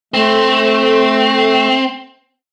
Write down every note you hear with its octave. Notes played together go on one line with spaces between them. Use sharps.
A3 C4